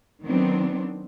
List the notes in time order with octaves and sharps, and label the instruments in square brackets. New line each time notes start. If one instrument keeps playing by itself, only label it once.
[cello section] D#3 F#3 B3 C4 D4